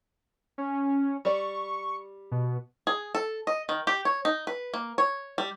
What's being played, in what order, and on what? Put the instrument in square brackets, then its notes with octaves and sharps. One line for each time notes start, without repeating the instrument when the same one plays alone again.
[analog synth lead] C#4
[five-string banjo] G3 D5 [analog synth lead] C#6
[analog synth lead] B2
[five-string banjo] G#4
A4
D#5
D#3
G4
C#5
D#4
B4
A#3
C#5
G3